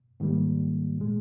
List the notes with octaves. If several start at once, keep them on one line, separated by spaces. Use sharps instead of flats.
G#2 D#3 G3 A#3
A#2 G#3